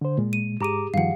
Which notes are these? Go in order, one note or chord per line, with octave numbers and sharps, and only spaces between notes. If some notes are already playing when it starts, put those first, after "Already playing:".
D3 C5
A#2 G#3
D#7
G#2 G4 G#4 A#5 D6 D#7
G2 D#3 F3 F5 F#5